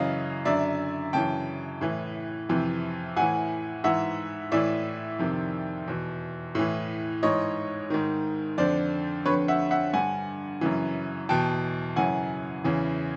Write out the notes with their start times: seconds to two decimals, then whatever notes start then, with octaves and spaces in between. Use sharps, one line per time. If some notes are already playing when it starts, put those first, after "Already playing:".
Already playing: F#2 C#3 E3 D#5 F5
0.45 F#2 D3 D5 E5
1.13 F#2 C#3 E3 G5 A5
1.81 A2 E3
2.49 F2 C3 E3
3.16 A2 E3 F#5 G#5
3.84 G#2 E3 E5 F#5
4.52 A2 E3 D5 E5
5.19 F2 C3 D#3
5.88 E2 B2
6.55 A2 E3
7.23 G#2 E3 C#5 D#5
7.90 G#2 D#3
8.58 F2 D3 C5 D5
9.26 F2 D3 B4 C#5
9.48 E5 F#5
9.71 E5 F#5
9.93 G2 D3 F#5 G#5
10.61 F#2 C#3 E3
11.29 E2 B2 G5 A5
11.96 F#2 C#3 E3 F#5 G#5
12.64 E2 C#3 E3